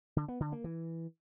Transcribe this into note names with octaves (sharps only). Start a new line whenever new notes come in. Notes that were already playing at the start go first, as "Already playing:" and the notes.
D3
B3
D3
A#3
E3